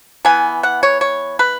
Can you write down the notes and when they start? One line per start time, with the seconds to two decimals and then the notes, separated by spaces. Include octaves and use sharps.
0.25 E3 B3 G#5
0.63 F#5
0.83 C#5
1.01 C#5
1.39 B4